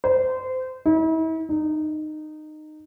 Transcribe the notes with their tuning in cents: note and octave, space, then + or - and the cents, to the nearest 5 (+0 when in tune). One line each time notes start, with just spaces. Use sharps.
C5 -25
E4 -40
D#4 -20